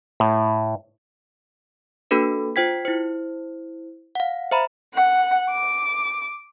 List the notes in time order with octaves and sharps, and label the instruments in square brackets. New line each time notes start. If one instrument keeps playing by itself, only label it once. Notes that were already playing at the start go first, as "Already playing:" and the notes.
[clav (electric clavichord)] A2
[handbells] A#3 D4 F#4 A4 B4
F4 C5 G5 G#6 B6
E4 C5
F5 F#5
C5 E5 A#5 B5
[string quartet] F#5
D6